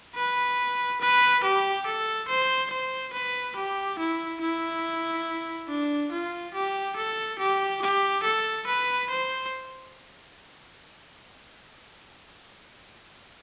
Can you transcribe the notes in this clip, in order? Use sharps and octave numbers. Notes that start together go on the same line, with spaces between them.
B4
B4
G4
A4
C5
C5
B4
G4
E4
E4
D4
F4
G4
A4
G4
G4
A4
B4
C5